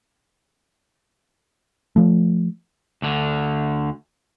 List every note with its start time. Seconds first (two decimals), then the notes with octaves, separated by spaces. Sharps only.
1.96 F3 A3
3.02 D2 D3